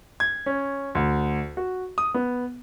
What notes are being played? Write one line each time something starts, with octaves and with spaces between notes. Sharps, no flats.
G#6
C#4
D2
F#4
D#6
B3